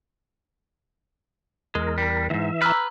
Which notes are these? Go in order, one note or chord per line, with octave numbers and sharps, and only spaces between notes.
E2 G#3 A#4
G3
D#2 G#2 E3 E5
B4 A#5 E6 F6